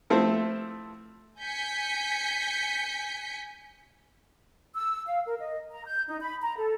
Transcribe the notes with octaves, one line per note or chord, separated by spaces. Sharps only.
F3 A3 C4 E4 A4 C5
G#5 G6 B6 C#7
E6
F5
A#4
D#5
A#5
G6
D#4
B5
A#5
A4